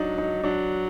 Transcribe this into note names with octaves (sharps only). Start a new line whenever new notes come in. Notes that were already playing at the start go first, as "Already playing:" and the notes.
Already playing: F#3 D4 D#4
D#4
F#3 D4